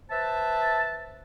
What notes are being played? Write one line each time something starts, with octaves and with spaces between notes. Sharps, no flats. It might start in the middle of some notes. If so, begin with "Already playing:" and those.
B4 C5 E5 A5